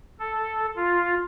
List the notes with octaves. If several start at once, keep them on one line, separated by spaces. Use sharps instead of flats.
A4
F4